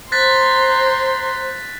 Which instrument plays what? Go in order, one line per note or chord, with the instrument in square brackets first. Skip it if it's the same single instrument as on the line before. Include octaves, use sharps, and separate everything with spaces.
[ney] C5 [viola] A#5 C6 [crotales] F#6 A6 B6